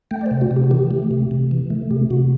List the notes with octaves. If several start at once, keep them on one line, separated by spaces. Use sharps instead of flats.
A3 G5
D5
C5
C3
F#4
C3
G4
F#4
E3 G4
A3
C3
C3
E3
A3
C3 G4
C3 F#4